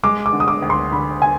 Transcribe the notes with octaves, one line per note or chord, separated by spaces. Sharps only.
G#3 D6
D6
D3
D#6
D6
D2
C6
D3 B5
G#5